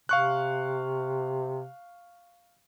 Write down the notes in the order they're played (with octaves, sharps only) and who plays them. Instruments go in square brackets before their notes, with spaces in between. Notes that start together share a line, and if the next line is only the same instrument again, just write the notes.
[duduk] C3 [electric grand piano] F5 C#6 F#6